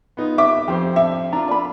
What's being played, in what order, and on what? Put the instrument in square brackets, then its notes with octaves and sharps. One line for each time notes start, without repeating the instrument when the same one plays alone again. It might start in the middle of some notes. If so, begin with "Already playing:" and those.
[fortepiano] B3 D#4 F4
[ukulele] E5 [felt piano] D6
[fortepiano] F2 C5 [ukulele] G4
[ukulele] D4 [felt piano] E5
[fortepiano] D4 F4 [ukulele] A#5
[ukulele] D5 B5